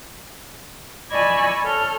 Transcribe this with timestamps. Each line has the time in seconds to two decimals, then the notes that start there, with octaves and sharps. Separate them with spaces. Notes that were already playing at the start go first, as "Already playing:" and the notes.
1.11 D5 D#5 G#5 B5 C#6 E6
1.64 A4 C#5 F6 G6